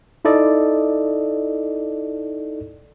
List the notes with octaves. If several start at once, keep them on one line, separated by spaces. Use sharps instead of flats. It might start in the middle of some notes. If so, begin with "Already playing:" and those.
D#4 E4 A4 D5 D#5